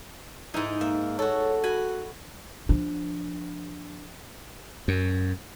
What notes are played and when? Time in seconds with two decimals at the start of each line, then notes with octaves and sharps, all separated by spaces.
0.54 G#2 D#4 E4
0.81 A#3 E5
1.19 F#4 A4 C#5
1.64 F#4 G#5 B5
2.69 F3 D4
4.88 F#2